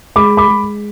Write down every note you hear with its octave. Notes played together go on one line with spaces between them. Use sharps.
G#3 B5 D6
B5 D6
G#3